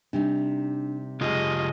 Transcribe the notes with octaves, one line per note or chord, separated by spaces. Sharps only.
C3 G3 D4 D#4
C#3 G#3 F4 G4 D#5 D#6